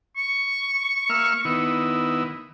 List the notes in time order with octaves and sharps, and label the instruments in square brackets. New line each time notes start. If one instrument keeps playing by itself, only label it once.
[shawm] C#6
[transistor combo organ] A#3 E5 F6
D#3 B3 E4